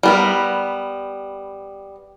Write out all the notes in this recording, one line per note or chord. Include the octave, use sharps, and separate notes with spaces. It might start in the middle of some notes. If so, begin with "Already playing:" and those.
G3 B3 A#4